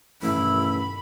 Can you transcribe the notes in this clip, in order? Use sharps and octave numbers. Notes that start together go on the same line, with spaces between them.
A1 G2 B2 D#3 E4 B5